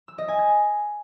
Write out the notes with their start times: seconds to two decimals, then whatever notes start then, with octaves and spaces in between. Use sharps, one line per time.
0.08 E6
0.18 D#5
0.28 G#5
0.39 G#6